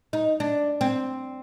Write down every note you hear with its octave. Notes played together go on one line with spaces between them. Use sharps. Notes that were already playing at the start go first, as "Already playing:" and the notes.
D#4
D4
C4